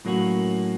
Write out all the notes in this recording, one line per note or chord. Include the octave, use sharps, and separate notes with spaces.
A2 F#3 A#3 C#4 F#4